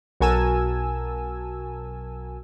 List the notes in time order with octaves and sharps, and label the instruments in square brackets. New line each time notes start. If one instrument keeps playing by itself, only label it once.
[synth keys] B1 F#4 A#4 G#5 A5 E6